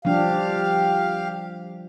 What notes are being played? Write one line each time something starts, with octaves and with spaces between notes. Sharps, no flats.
F3 G3 D4 G4 F5